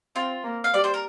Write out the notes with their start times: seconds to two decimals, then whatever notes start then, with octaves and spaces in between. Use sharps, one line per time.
0.15 C4 F4
0.44 A#3
0.64 F5
0.74 G3 D5
0.84 C5
0.94 A#4